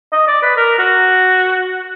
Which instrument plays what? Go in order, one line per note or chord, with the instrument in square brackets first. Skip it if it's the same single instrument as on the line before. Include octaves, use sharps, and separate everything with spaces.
[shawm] D#5
D5
B4
A#4
F#4